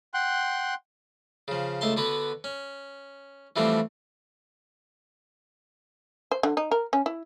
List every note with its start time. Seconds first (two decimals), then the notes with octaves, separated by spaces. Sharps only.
0.14 F#5 G5 C6 F#6
1.48 C#3 F3
1.81 C#2 A3 A5 C6
1.97 D3 B3 F#4 B4
2.44 C#4
3.56 E3 F3 G3 A3 C4 D4
6.31 C5
6.43 D3
6.57 D#4
6.71 A#4
6.93 C#4
7.06 E4